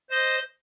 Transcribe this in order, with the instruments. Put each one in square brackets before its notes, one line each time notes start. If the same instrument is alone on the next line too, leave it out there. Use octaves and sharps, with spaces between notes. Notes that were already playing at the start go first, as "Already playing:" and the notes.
[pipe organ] C5 D#5